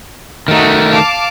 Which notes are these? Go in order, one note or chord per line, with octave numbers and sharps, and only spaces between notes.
D#3 A3 D#4 F#4
F5 A5 D6